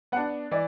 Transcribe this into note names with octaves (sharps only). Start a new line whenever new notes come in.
B3 D4 F#5
E3 D5